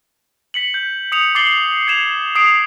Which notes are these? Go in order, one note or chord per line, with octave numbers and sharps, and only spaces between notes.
B6 C#7 F#7
G6
D#6 C#7 F7
D6 A6 C7 F#7 G7
G#6 C#7 E7 F7
D#6 C7 D7